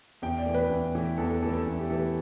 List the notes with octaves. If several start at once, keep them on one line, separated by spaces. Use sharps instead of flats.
E2 G5
D5
E3 A3
B4
E2
E3 A3
E2 A4
A4
E3 A3 A4
A4
E2
G4
E3 A3 A4